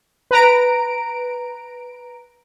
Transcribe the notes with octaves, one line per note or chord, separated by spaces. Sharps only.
B4 A#5 D7